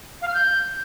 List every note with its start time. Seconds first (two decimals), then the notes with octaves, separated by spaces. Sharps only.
0.22 F5
0.28 F6
0.34 G6